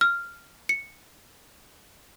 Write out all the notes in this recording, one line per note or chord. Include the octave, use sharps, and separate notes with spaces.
F6
C#7